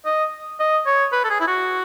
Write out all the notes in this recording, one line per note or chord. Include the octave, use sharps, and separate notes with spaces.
D#5
D#5
C#5
B4
A4
G#4
E4
F#4